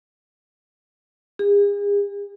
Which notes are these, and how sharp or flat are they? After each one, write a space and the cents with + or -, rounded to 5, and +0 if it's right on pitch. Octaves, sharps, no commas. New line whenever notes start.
G#4 -40